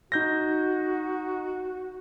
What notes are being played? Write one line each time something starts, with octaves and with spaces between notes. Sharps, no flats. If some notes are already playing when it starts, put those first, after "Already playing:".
D#4 F#4 G6 A#6